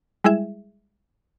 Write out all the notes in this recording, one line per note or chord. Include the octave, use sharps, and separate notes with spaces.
G3 G#3 E4 G#4 E5